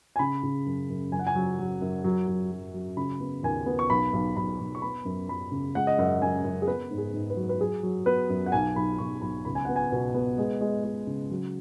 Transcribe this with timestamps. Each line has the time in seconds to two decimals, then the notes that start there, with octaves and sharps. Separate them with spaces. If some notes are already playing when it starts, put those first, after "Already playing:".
0.16 G#5
0.19 C#3 B5
0.43 C#3
0.66 F#2
0.89 F#2
1.12 F#1 G#5
1.19 F#5
1.27 G#5
1.35 F#3
1.59 F#3
1.81 F#2
2.04 F#3
2.27 F#3
2.51 F#3
2.74 F#3
2.97 C#3 B5
3.20 B3
3.43 D#2 G#5
3.66 B3
3.79 C#6
3.90 B1 B5
4.13 B1
4.36 B1 B5
4.60 B1
4.75 C#6
4.82 B3 B5
5.05 F#2
5.29 F#2 B5
5.52 C#3
5.75 G#3 F#5
5.87 D#5
5.98 F#2 F#5
6.22 F#2 G#5
6.44 F#2
6.62 G#4
6.67 B3 B4
6.91 G#2
6.98 G#4
7.14 G#2
7.30 B4
7.37 F#3
7.49 B4
7.60 F#3 G#4
7.83 F#3
8.06 B3 B4
8.29 F#2
8.46 F#5
8.52 B1 G#5
8.76 B1 B5
8.98 B1 C#6
9.22 B1 B5
9.45 C#2 B5
9.55 G#5
9.65 B3 F#5
9.76 G#5
9.92 B2
10.14 B3
10.38 G#3
10.61 G#3
10.84 G#3
11.07 C#3
11.31 F#3